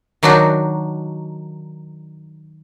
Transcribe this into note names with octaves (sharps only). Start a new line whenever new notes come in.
D#3 F#3 D4 D#4 F#4